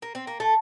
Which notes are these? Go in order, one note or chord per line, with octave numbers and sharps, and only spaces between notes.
A#3
C4
A#3
A3